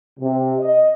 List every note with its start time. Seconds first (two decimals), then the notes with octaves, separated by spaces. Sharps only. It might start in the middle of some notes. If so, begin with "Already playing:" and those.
0.19 C3
0.59 D#5